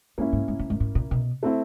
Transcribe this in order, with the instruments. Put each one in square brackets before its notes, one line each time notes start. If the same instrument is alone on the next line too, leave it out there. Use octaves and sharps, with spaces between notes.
[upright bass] G#2 [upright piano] A#3 C#4 E4
[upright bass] G#2
G#2
A2
G#2
A2
A#2
B2
[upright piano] A3 C4 E4